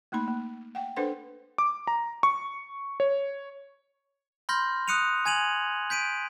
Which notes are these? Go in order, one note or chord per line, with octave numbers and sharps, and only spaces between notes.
A3 A#3 D#4 B5
A#3
F#5 G5
D4 A4 B4 C5 F#5 C6
D6
A#5
C#6
C#5
B5 C6 F6 G6 A#6
D#6 F#6 C#7 D#7 F7
G#5 G#6 D#7 F7 F#7
G6 B6 D7 D#7